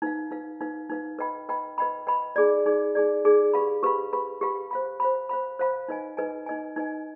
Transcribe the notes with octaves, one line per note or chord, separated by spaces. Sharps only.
D#4 B4 F5
D#4 B4 F5
D#4 B4 F5
D#4 B4 F5
B4 D#5 G5 B5
B4 D#5 G5 B5
B4 D#5 G5 B5
B4 D#5 G5 B5
D#4 G#4 D5
D#4 G#4 D5
D#4 G#4 D5
D#4 G#4 D5
G4 B4 F5 B5
G4 B4 F5 B5
G4 B4 F5 B5
G4 B4 F5 B5
C5 F5 B5
C5 F5 B5
C5 F5 B5
C5 F5 B5
D#4 B4 D#5 G#5
D#4 B4 D#5 G#5
D#4 B4 D#5 G#5
D#4 B4 D#5 G#5